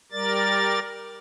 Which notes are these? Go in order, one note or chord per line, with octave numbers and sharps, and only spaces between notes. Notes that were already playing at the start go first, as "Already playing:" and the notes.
G3 A#4 D5 A6